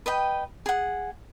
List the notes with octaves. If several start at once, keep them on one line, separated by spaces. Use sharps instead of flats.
B4 D#5 G5
G#4 F#5